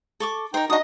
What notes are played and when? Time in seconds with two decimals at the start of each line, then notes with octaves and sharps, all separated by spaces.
0.20 A4 C#6 D6
0.54 D#4 A#4 C5 G5
0.70 D4 D#4 F#4 D#5 D#6